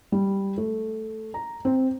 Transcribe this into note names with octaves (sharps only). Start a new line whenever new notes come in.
G3
A3
A#5
C4